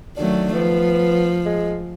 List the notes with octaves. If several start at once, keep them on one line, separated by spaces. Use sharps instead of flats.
D#3 F#3 A3 D4
F3 B3
G#3